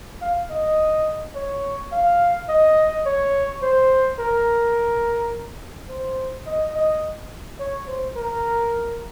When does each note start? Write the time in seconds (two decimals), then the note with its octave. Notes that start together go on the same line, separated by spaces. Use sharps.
0.22 F5
0.50 D#5
1.35 C#5
1.92 F5
2.48 D#5
3.06 C#5
3.62 C5
4.19 A#4
5.89 C5
6.46 D#5
6.75 D#5
7.59 C#5
7.88 C5
8.16 A#4